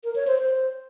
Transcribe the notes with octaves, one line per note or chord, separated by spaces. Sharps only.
A#4
C#5
C5
C5